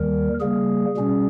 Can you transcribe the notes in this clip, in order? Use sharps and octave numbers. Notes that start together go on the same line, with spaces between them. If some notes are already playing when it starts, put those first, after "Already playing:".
Already playing: D#2 D#3 G3 A#4
C#3 G3 A#3 G#4
B2 G3 C#4